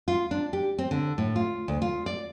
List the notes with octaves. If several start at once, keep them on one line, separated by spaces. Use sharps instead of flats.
F4
D4
G4
C4
D3
A2
F4
D2
F4
D5